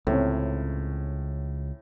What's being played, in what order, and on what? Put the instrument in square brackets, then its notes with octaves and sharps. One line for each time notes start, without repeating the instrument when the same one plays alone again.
[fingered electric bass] C#2 [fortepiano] A2 C3 C#4